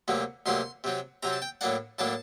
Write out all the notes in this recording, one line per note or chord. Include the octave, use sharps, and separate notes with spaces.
D2 C3 F#3 A#3
D2 C3 F#3 A#3 C6
C3 F#3 C4
C3 F#3 C4 A#5
A5
G5
A2 F#3 A#3 D4 F#5
A2 F#3 A#3 D4 A5